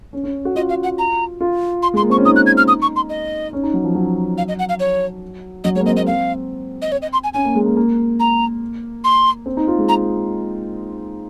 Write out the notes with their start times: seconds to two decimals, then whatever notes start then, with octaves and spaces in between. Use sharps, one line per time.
0.13 C#4
0.24 C#4
0.45 F#4
0.56 F4 D#5
0.69 F5
0.83 F#5
0.99 A#5
1.41 F4
1.83 C6
1.94 G#3
1.97 C6
2.02 A#3
2.10 C4 C#6
2.18 C#4
2.25 D#4 D#6
2.36 F#6
2.46 G#6
2.57 F6
2.68 D#6
2.82 C#6
2.96 C6
3.10 D#5
3.53 C#4
3.63 D#4
3.74 F#3
3.84 F3
3.95 F#3
4.38 F5
4.48 D#5
4.59 F#5
4.69 F5
4.80 C#5
5.64 F#3 D#5
5.75 G#3 C#5
5.80 A#3
5.85 C4 D#5
5.97 A#3 D#5
6.07 C4 F5
6.82 D#5
6.92 C#5
7.02 D#5
7.13 C6
7.24 G#5
7.34 C#4 G#5
7.45 A#3
7.55 G#3
7.66 A#3
7.76 A#3
8.20 A#5
9.04 C6
9.46 C4
9.57 D#4
9.67 F4
9.79 G#3
9.89 A#5